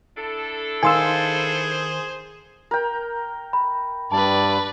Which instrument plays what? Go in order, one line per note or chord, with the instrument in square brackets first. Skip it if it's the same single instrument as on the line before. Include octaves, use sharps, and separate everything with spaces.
[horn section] D4 E4 A4
[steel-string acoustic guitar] D#3 F5 [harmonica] G#4 C5 [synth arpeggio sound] G#5 C6 E6
[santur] A#4 G5
[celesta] B5
[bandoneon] G2 [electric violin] B4 D5 [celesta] A5